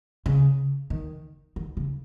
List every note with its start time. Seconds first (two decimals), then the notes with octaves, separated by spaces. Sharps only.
0.26 C#3
0.90 D#3
1.56 D#3
1.77 C#3